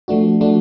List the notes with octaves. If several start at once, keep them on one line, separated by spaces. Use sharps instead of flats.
F3 A3 D4 F#4
F3 A3 D4 F#4